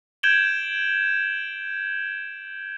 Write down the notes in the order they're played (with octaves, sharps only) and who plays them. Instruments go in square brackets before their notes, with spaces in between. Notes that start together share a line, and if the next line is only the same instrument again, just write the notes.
[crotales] G6 G#6 D7 E7 F#7 G7